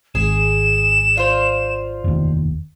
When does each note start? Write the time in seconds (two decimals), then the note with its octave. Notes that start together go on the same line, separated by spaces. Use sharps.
0.15 G#1 G#4 E7
1.15 D4 F4 C5
2.04 F1 D#2